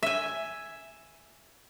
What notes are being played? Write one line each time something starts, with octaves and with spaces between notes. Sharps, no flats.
E5 G#5